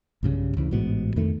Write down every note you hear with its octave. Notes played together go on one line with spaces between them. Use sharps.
B1 G2 C#3 G3
D2 C#3 E3
A1 G#2 B2
F2 D#3 A3